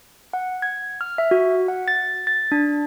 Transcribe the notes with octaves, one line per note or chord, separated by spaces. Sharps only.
F#5
G#6
F6
E5
F#4
F#5
A6
A6
D4